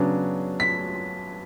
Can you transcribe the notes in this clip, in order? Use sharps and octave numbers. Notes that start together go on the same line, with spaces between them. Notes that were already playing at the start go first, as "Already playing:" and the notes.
Already playing: C#3 F#3 B3 D4
B6